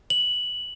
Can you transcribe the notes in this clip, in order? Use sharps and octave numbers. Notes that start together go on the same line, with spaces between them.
F#7